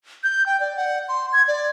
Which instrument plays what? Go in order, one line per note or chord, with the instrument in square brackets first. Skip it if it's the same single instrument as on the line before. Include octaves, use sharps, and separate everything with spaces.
[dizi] G6
G5
D5
F#5
C6
G#6
D5